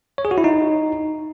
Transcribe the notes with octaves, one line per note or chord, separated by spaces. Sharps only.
C#5
G#4
F#4
E4
D#4